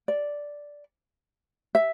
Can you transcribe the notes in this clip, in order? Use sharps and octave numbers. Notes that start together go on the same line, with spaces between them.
D5
E5